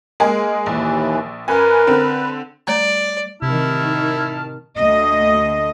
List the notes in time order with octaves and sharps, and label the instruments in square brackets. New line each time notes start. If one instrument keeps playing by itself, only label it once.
[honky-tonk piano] G#3 A#3 G#4
[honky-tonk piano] A#1 [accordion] D#2 E3
[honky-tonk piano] F#2 G#5 [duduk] A#4 [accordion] B4
[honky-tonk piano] D3 C4
[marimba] G3 A3 A#5 [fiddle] D5
[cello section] A2 D#3 [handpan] C3 [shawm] E4 [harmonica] A5 F6
[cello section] D2 D#5